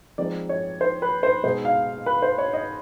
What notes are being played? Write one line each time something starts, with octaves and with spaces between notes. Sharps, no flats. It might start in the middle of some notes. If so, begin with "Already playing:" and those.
F3 G#3 C4 D#4 D5
C#5
C5
B4
C5
B2 G#3 B3 D#4 C5
F5
B4
C5
C#5
D#5